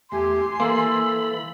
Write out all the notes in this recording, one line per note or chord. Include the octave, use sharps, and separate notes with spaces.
E2 A3 G4 G#5 C6
E3 A#3 A4 B5